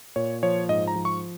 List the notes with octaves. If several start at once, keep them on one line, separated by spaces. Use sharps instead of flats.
A#2 C#5
F3 C#5
G#2 D#5
A#5
F3
C#6